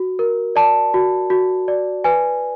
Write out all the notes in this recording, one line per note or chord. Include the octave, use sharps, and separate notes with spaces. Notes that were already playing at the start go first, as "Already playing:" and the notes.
Already playing: F#4
A#4
D5 A5
F#4
F#4
D5
B4 G#5